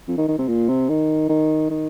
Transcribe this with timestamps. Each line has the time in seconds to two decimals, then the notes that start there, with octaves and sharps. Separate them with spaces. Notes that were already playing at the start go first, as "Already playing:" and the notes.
0.08 F2
0.18 D#3
0.28 D#3
0.38 C3
0.48 A#2
0.69 C3
0.89 D#3
1.29 D#3
1.71 D#3